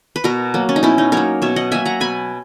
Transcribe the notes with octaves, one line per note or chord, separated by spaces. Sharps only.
B4
B2 F#4 A#4
F#3 A#3
C#4
D#4
B2 C#4 E4
D#4
F#3 A#3 A#4 C#5
B2 C#5 E5
D#5 F#5
F#3 A#3 E5 G#5
F#5 A#5
B2 G#5 B5